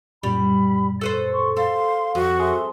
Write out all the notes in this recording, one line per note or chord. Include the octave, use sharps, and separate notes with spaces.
F#2 A#2 G3 B5
A4 B4 C5
C6 C#6
A4 F5 C6
F2 F#4
G#4 A4 E5 C6